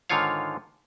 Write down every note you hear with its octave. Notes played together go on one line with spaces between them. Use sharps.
G#2 D3 D#3 F4 C#5 F5